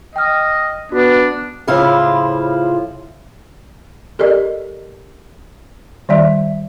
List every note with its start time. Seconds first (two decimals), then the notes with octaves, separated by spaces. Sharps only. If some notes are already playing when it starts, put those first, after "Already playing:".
0.16 D#5 G5 F6
0.92 B3 D4 F#4
1.67 A2 C#3 F3 E4 F4 C5
4.19 G4 A4 A#4 D5 D#5
6.09 D#3 G3 D5 E5